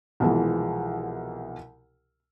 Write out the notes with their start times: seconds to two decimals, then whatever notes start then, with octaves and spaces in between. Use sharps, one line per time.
0.20 C2 B2 E3 F3 G#3